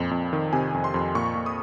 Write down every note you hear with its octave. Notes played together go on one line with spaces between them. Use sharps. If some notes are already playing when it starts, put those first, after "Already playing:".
Already playing: F2 A#2
F2
D#3
C3 G#5
F2
C6
F2
A#2 C#6
A#2
D#6